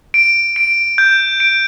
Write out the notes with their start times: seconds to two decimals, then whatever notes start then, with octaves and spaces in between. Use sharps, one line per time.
0.14 D7
0.56 D7
0.98 G6
1.40 D7